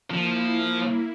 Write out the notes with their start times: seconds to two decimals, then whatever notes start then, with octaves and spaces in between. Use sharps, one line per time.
0.10 F3 A#3 E4